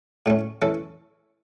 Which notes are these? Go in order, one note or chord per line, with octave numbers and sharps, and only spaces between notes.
A2 A3 C#4
E3 C#4 A4